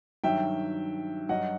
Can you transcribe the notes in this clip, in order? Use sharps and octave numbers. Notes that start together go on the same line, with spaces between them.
G2 D#3 F#3 E5 G5
G2 F#3 D#5 F#5